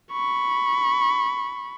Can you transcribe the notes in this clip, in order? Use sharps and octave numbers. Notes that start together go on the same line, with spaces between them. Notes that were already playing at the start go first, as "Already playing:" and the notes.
B5 C#6